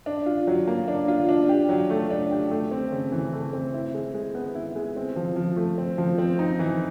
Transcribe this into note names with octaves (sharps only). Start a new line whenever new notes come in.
D4
F4
F#3
A#3
D4
F4
D4
G4
F#3
A3
D4
G4
A3
C4
C#3
E3
A3
C4
E4
G#3
G#3
B3
E4
G#3
C4
F3
F3
A3
C4
F3
C4
D#4
E3